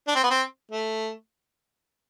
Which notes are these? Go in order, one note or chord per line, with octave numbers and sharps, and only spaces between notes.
D4
C4
B3
C4
A3